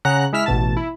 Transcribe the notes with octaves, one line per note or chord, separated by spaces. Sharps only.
C#3 F#5 A#5 F#6
G#3 E4 E5 F6 B6
A1 B2 A5
E4